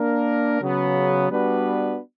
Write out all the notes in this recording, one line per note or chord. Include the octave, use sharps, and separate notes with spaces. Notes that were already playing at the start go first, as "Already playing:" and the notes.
Already playing: A#3 D4 A#4
C#3 F#3 B3
G3 B3 D4 F#4 B4